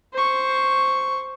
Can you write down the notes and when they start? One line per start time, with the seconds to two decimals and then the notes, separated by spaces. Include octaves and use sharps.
0.14 C5 C#6